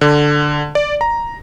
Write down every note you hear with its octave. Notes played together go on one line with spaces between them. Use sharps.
D3
D5
A#5